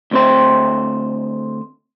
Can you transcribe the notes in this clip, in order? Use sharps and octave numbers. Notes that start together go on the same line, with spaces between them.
D2 C4 C5